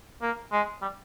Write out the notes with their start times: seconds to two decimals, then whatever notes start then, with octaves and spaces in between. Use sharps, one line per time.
0.22 A#3
0.53 G#3
0.82 G3